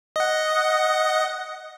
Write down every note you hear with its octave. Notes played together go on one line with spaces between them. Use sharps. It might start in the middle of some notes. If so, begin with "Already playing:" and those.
D#5 F#5